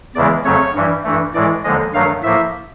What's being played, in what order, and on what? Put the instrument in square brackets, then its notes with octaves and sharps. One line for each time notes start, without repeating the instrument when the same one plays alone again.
[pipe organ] E2 C#3 E3 G#3 D5
F2 C#3 F#3 A3 C#5
G2 E3 G3
G2 E3 A3
A2 E3 G#3 D5
D#2 D3 F3 G#3 D#5
G2 D#3 F#3 A3 F5
A2 F3 A#3 E5